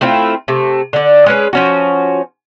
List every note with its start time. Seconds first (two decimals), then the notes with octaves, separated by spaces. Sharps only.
0.01 A3 C4 E4 F4
0.48 C3 A3
0.93 D3 D5
1.26 G#3 C#4 B4
1.53 F3 C#4 F#4